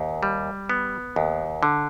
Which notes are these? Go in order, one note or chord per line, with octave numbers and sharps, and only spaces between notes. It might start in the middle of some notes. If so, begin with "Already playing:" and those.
Already playing: D#2
G3
B3
D#2
D3